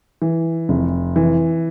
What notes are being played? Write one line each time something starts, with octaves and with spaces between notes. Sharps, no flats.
E3
F1
E3